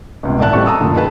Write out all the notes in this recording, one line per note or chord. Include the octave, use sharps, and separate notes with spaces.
G1 C#2 C3
A1 D#3 D5 E5 A5 F#6
A1 G3 A3 C4 A4 C#6
A5 A#5 D#6 E6
F#1 A2 D3 F3
D#4 G#4 B4 A5